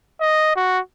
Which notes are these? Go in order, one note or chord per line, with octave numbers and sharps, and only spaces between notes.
D#5
F#4